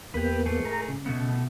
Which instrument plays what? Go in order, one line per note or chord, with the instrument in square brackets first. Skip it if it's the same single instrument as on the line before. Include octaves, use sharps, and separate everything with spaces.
[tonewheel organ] E2 A#3 B3 [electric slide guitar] G4 B4
[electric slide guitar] G#2 A3 G#4
[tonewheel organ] A#4 A#5
C#3
[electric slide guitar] B2 A3 B3